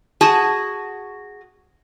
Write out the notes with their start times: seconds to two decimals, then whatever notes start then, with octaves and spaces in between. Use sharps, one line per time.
0.21 F#4 G#4 A5